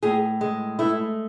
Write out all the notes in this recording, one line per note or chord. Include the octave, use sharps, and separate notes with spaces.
A2 G#4
G#3
A3 E4